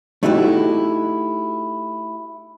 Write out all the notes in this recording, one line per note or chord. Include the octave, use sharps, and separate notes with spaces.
A3 D#4 E4 F#4 G4